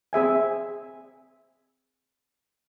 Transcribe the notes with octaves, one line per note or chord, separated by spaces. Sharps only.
C4 G#4 E5 G#5